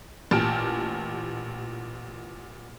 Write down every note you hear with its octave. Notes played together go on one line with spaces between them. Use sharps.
A1 A#2 G4 A5 F6 D7